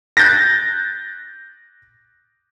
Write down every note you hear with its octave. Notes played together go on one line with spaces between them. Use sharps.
F#6 G6 A6 A#6